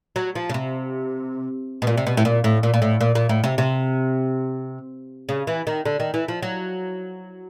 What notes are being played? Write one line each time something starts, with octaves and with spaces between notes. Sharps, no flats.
F#3
F3
C#3
C3
B2
A#2
C3
B2
A2
A#2
A2
A#2
A#2
A2
A#2
A#2
A2
C3
C3
C#3
E3
D#3
D3
D#3
E3
F3
F#3